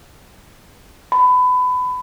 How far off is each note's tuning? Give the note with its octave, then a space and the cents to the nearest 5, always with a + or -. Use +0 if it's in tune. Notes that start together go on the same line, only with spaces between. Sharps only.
B5 +25